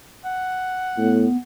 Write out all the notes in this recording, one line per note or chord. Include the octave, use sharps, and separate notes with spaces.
F#5
A2 B3